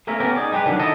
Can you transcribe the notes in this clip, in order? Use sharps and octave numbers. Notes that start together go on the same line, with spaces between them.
A3 A#3 C#4 A#4 E5
B3 C#4 G4 A#4
D#4 G#4 D5
G3 G#3 G4 G#4 B4
D3 D#3 F#3 D4
D#4 E4 A4 D#5